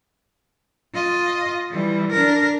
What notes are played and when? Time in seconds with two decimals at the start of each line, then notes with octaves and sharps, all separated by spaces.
0.93 F4 D#5
1.71 E3 G3
2.12 D4 A#4